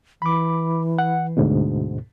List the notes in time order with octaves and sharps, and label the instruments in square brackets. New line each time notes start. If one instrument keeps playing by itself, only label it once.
[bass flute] E3 [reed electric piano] B5 D6
[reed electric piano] F#5
D2 G#2 B2